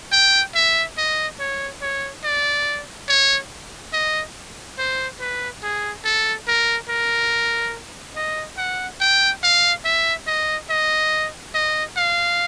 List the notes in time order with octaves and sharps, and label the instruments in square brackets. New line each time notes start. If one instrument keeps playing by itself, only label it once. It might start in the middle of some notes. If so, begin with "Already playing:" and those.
[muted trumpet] G5
E5
D#5
C#5
C#5
D5
C#5
D#5
C5
B4
G#4
A4
A#4
A#4
D#5
F#5
G5
F5
E5
D#5
D#5
D#5
F5